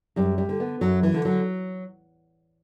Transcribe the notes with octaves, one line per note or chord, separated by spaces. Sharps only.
F#2 G3
G3
D3
B3
F#2 F#3
E3
D3
F#3